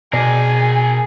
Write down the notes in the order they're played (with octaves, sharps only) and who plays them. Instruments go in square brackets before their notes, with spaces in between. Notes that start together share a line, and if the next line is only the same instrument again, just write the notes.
[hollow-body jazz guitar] B2 D5 [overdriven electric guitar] G#4 A#4 [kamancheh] G#5